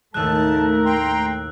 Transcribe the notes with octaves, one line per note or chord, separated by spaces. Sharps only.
D#2 A2 G#3 A3 A#4 A5 E6 F#6
G5 A#5 C6